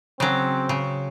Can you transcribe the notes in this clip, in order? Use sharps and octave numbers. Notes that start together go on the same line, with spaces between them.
C#3 F#3 C4
C#3